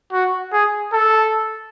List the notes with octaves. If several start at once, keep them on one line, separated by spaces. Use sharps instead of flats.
F#4
G#4
A4